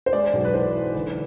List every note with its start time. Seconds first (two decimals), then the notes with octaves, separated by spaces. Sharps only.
0.06 C5
0.13 G#3 D5
0.33 B1
0.45 B4
0.54 E3 C5
0.75 E3
0.95 D3 B4